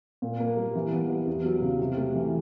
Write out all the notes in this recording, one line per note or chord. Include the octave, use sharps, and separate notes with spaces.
A#2
A#3
G3
E3
B3
G3
E2
F#3
C#3
C3
A3
E3